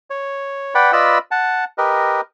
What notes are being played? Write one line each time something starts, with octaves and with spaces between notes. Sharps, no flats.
C#5
B4 D5 F#5 G5 B5
F4 B4 D5 D#5 B5 E6
F#5 A5
G4 A#4 B4 D#5